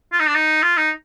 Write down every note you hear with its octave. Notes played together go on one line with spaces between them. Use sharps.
F4
D#4
D4
D#4
F4
D#4